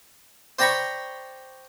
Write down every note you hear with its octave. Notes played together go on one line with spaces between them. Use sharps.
C5 D5 G5 A#5 B5 C#6